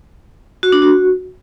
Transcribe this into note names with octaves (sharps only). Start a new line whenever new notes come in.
F#4
D4
F#4